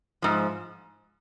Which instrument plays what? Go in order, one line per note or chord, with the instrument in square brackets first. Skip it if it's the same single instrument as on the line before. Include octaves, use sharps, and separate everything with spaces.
[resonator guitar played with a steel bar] G#2 F3